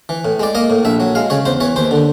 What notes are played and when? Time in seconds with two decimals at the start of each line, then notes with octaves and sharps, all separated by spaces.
0.09 E3
0.25 A2
0.40 G#3 D5
0.55 A#3 D#5
0.70 A2
0.85 A#1 E5
1.00 F#3
1.15 G#3 F5
1.30 C#3 C#5
1.45 E2 C5
1.60 E3 C#5
1.76 D#2 C5
1.91 D3